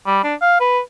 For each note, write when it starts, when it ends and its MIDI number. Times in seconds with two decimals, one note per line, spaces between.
0.07 0.20 55
0.24 0.35 62
0.42 0.60 77
0.61 0.80 71